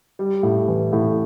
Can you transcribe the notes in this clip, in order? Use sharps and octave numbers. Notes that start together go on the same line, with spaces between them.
G3
A2
E3
A2